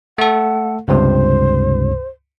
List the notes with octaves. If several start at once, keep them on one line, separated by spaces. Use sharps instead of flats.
A3 A4 F#5
C#2 G2 C3 C5